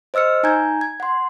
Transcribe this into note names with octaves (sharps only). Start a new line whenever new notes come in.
C5 D#5 E6 F6 C#7
D#4 G#5 A#5 G6 G#6
G#6
F#5 C6